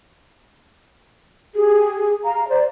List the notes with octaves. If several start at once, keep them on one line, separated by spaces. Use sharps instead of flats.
G4 G#4
F5 A#5
C5 D5